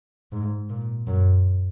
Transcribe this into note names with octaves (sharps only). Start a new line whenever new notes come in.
G#2
A#2
F#2